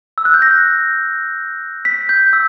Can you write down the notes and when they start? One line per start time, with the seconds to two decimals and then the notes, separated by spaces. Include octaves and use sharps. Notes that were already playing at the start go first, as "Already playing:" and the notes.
0.18 E6
0.25 F#6
0.34 G6
0.42 A#6
1.85 B6
2.09 G6
2.33 E6